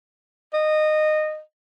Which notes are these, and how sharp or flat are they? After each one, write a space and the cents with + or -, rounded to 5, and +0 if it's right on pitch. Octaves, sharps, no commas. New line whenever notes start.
D#5 -20